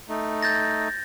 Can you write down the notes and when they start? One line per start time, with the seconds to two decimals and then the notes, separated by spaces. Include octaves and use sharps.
0.09 A3 D#4
0.43 G6 A6 A#6